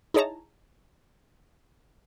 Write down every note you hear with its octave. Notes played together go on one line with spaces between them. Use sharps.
D#4 E4 G#4 C#5 A5 A#5